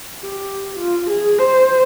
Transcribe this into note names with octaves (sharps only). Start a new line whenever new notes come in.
G4
F4
G#4
C5